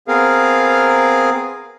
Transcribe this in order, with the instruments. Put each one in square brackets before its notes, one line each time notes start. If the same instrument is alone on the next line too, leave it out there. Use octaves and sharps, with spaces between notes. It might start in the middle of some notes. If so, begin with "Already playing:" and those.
[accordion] B3 C4 G#4 A#4 F5